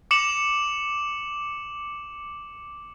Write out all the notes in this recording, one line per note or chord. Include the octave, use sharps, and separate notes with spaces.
D6 C#7 E7 F#7